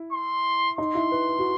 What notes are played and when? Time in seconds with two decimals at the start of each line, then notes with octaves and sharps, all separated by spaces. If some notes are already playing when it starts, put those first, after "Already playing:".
Already playing: E4
0.12 C6
0.78 D#4 C6
0.95 E4
1.12 B4
1.28 B4
1.39 F#4